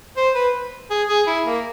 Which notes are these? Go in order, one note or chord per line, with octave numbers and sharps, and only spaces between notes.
C5
B4
G#4
G#4
E4
A#3